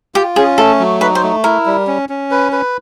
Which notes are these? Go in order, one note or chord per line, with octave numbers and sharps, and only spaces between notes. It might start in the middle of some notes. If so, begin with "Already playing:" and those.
F4 G4
C#4 G#4
A3 A4
F#3
D#4 B4
C5
A3
E4 A#4
G3
C#4
C#4
B4
B4